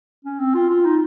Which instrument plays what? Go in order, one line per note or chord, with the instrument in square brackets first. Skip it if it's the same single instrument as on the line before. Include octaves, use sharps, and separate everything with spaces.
[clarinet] C#4
C4
F4
F4
D#4